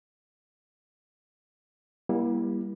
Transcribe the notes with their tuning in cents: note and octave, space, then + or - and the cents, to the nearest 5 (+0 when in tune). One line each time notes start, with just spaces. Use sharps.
G3 +10 A#3 +40 E4 +0